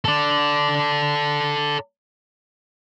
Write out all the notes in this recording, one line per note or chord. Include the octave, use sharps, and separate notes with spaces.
A4 D5